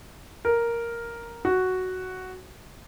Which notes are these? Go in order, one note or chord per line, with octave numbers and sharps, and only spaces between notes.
A#4
F#4